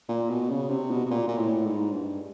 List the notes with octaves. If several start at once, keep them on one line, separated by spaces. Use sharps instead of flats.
A#2
B2
C#3
C3
B2
B2
A#2
A#2
A2
G#2
G2